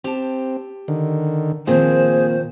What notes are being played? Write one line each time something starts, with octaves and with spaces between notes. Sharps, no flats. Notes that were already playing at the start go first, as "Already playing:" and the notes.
C4 G4 A5
D3 D#3
A#2 D#3 F3 A#3 C4 F4 G#4 C5